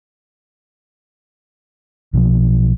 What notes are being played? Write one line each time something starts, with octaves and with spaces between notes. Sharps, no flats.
B1 B2 D3 F3